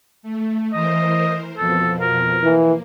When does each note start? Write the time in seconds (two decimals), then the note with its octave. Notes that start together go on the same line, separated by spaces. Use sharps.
0.23 A3
0.73 E3 A#4 C5 D#5
1.58 F2 B2 F3 A4
1.99 A#4
2.44 E3 A#3